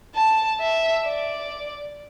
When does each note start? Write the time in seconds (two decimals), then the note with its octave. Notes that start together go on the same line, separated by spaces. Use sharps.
0.15 A5
0.60 E5
1.06 D5